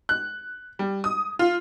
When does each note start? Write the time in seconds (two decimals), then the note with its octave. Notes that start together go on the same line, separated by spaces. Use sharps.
0.09 F#6
0.79 G3
1.04 D#6
1.39 F4